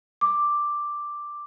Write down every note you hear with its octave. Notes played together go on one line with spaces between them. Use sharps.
D6